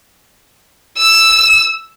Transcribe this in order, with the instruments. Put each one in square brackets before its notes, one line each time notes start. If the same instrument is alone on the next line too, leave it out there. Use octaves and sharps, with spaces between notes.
[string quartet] E6